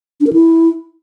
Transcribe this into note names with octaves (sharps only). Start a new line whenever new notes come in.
D4
A#4
E4